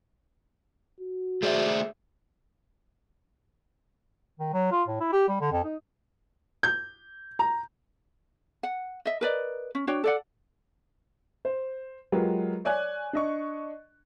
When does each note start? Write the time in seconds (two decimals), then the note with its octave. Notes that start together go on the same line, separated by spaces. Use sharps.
1.00 F#4
1.43 A3 G#4 C5 D5 E5
4.39 D#3
4.53 F#3
4.71 F4
4.88 A2
5.00 E4
5.13 G4
5.29 G3
5.41 D3
5.52 F2
5.64 D#4
6.63 G6
7.39 A#5
8.63 F#5
9.05 D#5 E5
9.21 A#4 B4 D5 D#5
9.75 C#4
9.87 D4 F#4 C#5 G5
10.04 A4 D5 F#5
11.45 C5
12.12 F#3 G#3 F4 G4 A#4 B4
12.65 C#5 D5 G#5 F#6 G#6
13.13 D4 D#5 C#6